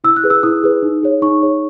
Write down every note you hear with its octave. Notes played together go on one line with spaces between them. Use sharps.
E4 E6
F#6
G#4 B4
E6
E4 D#6
G#4 B4
D#4
G#4 C#5
D#4 C#6
G#4 C#5